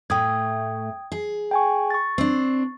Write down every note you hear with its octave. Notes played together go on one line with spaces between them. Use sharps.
A2 A3 G5 D#6 G#6
G#4
G5 G#5 C#6
C#6 A6
C4 D4